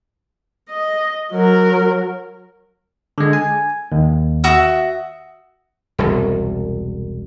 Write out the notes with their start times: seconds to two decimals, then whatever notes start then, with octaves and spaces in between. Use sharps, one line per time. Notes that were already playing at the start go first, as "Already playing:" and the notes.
0.70 D#5
1.33 F#3 A#4
3.18 D3 G#3
3.33 G#5
3.92 D#2
4.44 F#4 E5 D#6
5.98 E1 C2